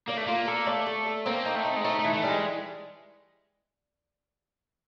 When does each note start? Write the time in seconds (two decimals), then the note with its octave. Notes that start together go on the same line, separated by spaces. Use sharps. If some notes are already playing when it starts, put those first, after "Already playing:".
0.08 A#3 D5
0.18 A3
0.27 A#3 F4
0.48 A4
0.66 A3 D5
0.87 A4
1.06 A4
1.26 A#3 C4
1.45 D#4
1.55 A3
1.65 D#4
1.76 G#3
1.84 A3 D#4
1.99 A3
2.05 E3
2.14 A3
2.23 G3
2.29 G#3